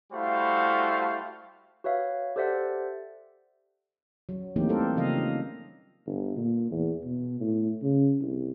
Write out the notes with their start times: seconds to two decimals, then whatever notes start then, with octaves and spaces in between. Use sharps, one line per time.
0.13 G3 A3 E4 F#4 C5 F5
1.84 F#4 B4 C#5 E5 F5
2.36 G4 A4 C5 D5 E5 F#5
4.29 F#3
4.56 E3 A3 A#3 C4 D#4 G4
4.69 G3 A3 C4 A4 A#4 C5
4.96 C#3 F3 A#3 D#5 F5
5.17 D#4
6.06 G1
6.37 A#2
6.71 E2
7.04 B2
7.41 A2
7.83 C#3
8.21 C2